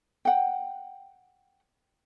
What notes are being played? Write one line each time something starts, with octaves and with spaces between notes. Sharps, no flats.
F#5 G5